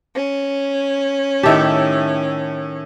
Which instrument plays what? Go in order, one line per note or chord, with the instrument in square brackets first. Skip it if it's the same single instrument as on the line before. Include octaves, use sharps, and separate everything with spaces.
[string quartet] C#4
[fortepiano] A2 E5 A5 [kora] D#3 G4